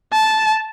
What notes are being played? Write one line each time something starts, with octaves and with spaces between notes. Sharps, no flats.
A5